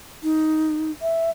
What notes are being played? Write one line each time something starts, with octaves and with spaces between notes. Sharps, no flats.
D#4
E5